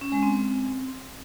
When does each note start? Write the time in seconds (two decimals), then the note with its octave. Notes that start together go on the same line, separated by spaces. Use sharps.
0.01 C#4
0.12 G#3
0.23 C4
0.33 C4